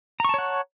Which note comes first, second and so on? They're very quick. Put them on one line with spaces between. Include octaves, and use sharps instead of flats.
A#5 C#6 A5 C#5 F#5